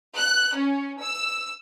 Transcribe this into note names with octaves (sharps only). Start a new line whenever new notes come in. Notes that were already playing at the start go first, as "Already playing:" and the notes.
F#6
C#4
E6